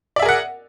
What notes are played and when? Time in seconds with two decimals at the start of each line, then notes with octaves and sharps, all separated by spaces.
0.16 D5
0.19 E5
0.22 G#4
0.26 A#4
0.29 F#5